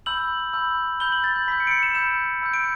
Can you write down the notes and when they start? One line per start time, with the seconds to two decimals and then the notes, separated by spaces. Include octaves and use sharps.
0.06 B5 E6 G6 F#7
0.53 B5 E6 G6
1.00 B5 E6 G6 G7
1.12 F#7
1.24 A6
1.36 G6
1.48 B5 E6 G6 B6
1.60 C#7
1.67 D7
1.71 C#7
1.83 E7
1.95 B5 E6 G6 E7
2.42 B5 E6 G6
2.54 D7